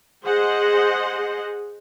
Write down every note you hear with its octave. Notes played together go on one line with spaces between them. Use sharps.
G#4 C5 D#5 F#5